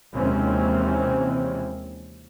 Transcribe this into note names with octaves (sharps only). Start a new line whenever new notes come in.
D#2 C3 E3 G#3 C4 C#4